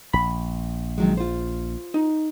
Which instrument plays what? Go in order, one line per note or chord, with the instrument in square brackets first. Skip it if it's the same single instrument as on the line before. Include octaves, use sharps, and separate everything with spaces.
[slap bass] A#1 [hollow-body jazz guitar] B5
[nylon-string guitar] D#3 F#3 G#3
F4 C5
[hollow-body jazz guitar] D#4